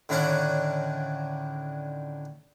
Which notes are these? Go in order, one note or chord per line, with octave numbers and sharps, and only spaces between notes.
A2 D3 D#3 C#4 D4 F#5